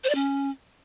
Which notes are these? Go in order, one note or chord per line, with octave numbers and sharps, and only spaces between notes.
C5
D5
C#4